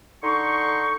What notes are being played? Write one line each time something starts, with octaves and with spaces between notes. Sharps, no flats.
D3 D#4 C6 C#6